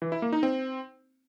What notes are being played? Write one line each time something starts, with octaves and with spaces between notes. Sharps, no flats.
E3
E4
A#3
D#4
C4